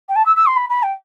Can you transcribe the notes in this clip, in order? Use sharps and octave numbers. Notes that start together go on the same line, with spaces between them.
G5
A5
E6
E6
C6
B5
B5
G5